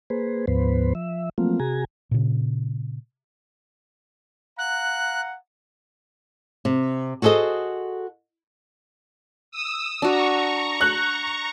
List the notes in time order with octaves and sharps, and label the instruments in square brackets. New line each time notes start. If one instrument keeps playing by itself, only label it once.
[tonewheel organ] A#3 G#4 B4 C5
D2 G#2 F3 B3 B4 C5
F3 E5
F3 F#3 A3 A#3 C4 F4
C3 F#4 G#4 G#5 A#5
[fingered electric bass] A#2 C#3
[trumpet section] F5 F#5 A#5 [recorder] F#6
[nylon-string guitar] C3
F#4 G#4 A4 C5 D#5
[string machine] D#6 E6
[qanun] D4 F#4 [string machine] A#5 C#6
[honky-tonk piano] F#6